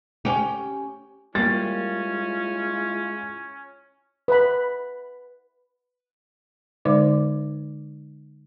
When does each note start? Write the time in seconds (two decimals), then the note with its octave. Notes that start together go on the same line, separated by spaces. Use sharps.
0.25 C#4 G4
1.35 G3 G#3 A#3 C#4 E4 F4 A6
4.28 B4 B5
6.85 D3 G#3 D#4 C5 D5 D6